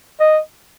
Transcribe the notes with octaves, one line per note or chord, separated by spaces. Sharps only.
D#5